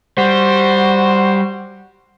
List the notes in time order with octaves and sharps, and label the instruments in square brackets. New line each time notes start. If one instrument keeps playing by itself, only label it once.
[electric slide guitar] G3 [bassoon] F#4 [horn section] C5